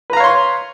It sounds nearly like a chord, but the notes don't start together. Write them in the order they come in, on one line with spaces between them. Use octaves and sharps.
B4 A#5 F5 C#5 C6